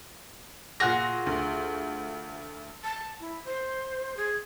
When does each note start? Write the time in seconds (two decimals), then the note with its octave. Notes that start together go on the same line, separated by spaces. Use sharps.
0.80 A#2 F4 F#4 G#4 F#6 A#6
1.27 D2
2.84 A5
3.21 E4
3.45 C5
4.17 G#4